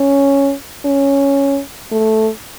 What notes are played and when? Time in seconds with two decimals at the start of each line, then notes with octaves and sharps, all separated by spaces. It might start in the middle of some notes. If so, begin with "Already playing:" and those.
Already playing: C#4
0.85 C#4
1.91 A3